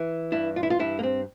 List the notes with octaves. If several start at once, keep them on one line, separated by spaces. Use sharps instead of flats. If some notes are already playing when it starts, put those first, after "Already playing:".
Already playing: E3
G2 E4
F4
E4
F4
G2 E4
A#3
C4